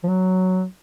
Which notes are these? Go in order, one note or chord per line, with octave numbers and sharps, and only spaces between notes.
F3
F#3